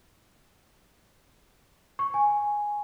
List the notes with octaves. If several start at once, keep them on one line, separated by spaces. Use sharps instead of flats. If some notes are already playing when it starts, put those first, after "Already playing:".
C#6
G#5